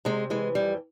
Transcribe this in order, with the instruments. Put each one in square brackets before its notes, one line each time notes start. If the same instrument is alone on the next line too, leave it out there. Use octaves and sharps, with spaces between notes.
[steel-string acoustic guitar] C3 G#3
E3 G#3
F2 G3